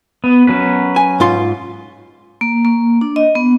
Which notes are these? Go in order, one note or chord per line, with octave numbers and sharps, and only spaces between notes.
B3
F#3 C#4 B4
G#5
G#2 F4 C6
A#3
A#3
D4
D#5
B3